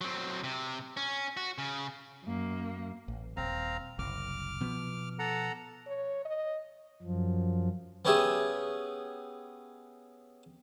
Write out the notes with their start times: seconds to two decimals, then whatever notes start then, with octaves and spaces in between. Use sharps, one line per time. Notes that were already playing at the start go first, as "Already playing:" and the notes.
0.01 F#3 C4
0.44 C3
0.97 C#4
1.37 F#4
1.58 C#3
2.25 F#2 A#3
3.08 A1
3.37 D#1 C4 F5 A#5
3.99 F#1 C2 D6 F6
4.60 B2 F3 B3
5.19 A4 F#5 A#5
5.87 C#5
6.25 D#5
7.02 F#2 F3
8.05 B3 C#4 G4 G#4 E5